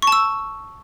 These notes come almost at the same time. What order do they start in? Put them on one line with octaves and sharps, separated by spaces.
C#6 A5 E6